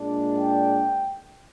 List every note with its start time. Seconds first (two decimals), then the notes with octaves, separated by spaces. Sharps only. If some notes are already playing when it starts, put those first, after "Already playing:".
Already playing: A#2 G#3 D4
0.38 G5